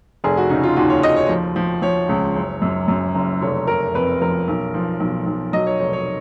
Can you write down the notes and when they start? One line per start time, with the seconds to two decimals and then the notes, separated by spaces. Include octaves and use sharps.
0.24 F1 G#4
0.37 F#4
0.50 C#3 D#4
0.63 F4
0.76 D#2 F#4
0.90 C#5
1.03 D#2 D#5
1.16 C#5
1.29 F3
1.56 F3
1.82 F3 C#5
2.09 C#2
2.36 F#1
2.62 F#2
2.88 F#2
3.15 F#1
3.42 F1 C#5
3.67 F1 A#4
3.94 F2 B4
4.21 F3 A#4
4.48 B1
4.74 F3
5.00 B1
5.26 B1
5.53 F#3 D#5
5.67 C#5
5.80 F1 C#5
5.93 C#5